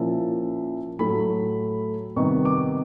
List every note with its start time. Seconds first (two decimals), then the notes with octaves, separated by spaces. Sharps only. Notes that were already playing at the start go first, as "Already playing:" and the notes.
Already playing: A#2 F3 A#3 C#4 E4 A5
0.99 A2 F#3 A3 B5
2.16 C3 D#3 G3 B3 D#4 C#6
2.45 D6